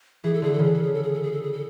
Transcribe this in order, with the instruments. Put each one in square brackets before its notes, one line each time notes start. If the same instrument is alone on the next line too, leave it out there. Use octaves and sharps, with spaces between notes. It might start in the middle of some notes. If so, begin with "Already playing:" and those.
[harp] E3 [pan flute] G#4
[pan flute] A4
[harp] D3 [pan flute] G#4
[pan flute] A4
[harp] C#3
[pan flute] G#4
A4
G#4
A4
G#4
A4
G#4
A4
G#4
A4